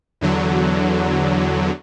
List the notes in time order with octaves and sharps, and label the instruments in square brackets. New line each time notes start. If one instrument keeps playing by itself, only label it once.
[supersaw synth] E2 D3 F#3